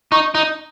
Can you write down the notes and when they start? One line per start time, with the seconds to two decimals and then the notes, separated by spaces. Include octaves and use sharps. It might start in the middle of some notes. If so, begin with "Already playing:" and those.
0.12 D#4 C#6
0.35 D#4